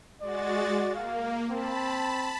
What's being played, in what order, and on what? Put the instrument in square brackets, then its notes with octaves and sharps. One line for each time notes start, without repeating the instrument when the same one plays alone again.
[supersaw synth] G#3 F#4 A6 [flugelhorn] D5
[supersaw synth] A#3 [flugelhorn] F5
[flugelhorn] C4 [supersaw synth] A5 B5